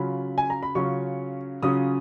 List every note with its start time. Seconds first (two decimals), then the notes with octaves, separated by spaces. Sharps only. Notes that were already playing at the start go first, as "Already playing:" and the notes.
Already playing: C#3 F#3 C#4 F4 B5
0.38 G#5
0.50 A#5
0.63 B5
0.75 C#3 F#3 C#4 F4 C#6
1.63 C#3 F#3 C#4 F4 D#6